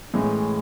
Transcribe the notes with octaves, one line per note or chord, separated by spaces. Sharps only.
A2 E3 G#3 C#4